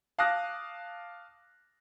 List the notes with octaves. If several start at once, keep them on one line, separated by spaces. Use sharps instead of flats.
F5 A5 D6 D#6 F#6 A#6